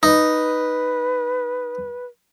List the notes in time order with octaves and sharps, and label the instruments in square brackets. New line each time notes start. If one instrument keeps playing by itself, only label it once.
[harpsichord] D#4 [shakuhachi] B4